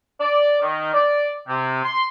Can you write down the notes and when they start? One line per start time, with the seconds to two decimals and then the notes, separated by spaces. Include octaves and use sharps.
0.21 D5
0.61 D#3
0.93 D5
1.47 C3
1.82 C6